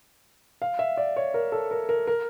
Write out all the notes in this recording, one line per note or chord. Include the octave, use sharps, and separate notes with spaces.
F5
E5
D5
C#5
A#4
A4
A#4
A#4
A#4